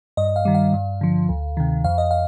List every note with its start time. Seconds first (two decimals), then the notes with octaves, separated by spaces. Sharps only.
0.17 G2 D#5
0.36 F5
0.45 D#3 G3
0.55 F5
0.73 G2
1.01 D3 F3
1.29 D2
1.57 C3 D#3
1.84 F2 F5
1.98 D#5
2.11 F5